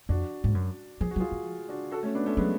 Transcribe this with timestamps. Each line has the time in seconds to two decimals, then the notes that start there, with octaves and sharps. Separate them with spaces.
0.09 F2 D4 F#4
0.44 G#2
0.55 F#2
1.01 F3 G#4
1.11 F#4
1.16 F#3
1.20 F4 G#4
1.31 F3
1.69 D4 F#4
1.91 F#4 A4
2.03 A3 C#4
2.15 B3 D4
2.26 A3 C#4
2.37 F#3 G#3 B3